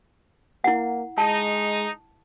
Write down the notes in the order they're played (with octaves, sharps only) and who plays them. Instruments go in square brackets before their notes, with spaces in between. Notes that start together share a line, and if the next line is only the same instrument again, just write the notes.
[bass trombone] A#3 [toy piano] E4 F#5
[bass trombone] G#3 [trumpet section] D#4 [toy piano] A5